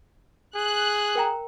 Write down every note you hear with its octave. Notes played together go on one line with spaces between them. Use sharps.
G#4 F#6
A#4 G5 A#5